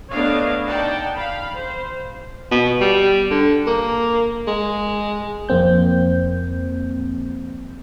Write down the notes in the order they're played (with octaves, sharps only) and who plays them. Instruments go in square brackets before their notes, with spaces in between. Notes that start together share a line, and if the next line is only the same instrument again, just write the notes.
[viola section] A3 B3 D4 C#5 D#5 F5
D#4 D5 F#5 G5 A5
F5 B5
C5
[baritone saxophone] B2
G3
D3
A#3
G#3
[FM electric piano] F2 A#3 C4 G6